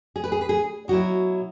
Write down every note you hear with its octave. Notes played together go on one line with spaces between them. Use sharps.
G#4
B4
G#4
B4
G#4
B2 F#3 E4 F#4